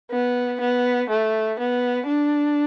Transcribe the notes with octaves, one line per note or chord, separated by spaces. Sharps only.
B3
B3
A3
B3
D4